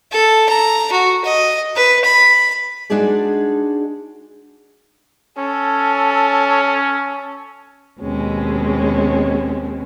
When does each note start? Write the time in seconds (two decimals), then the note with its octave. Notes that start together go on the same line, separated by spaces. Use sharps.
0.12 A4
0.49 A#5
0.92 F#4
1.25 D#5
1.76 B4
2.04 B5
2.90 G#3 D4 D#4 F#4 G#4 D5
5.38 C#4 A4
8.00 D#2 B2 G#3 C4 C#4